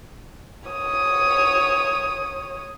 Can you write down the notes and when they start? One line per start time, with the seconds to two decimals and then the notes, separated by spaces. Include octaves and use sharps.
0.69 C#5 D#6